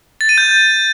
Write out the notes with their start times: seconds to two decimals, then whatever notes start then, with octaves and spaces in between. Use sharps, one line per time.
0.21 A6
0.29 D#7
0.38 G6